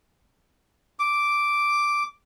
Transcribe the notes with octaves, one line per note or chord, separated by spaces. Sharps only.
D6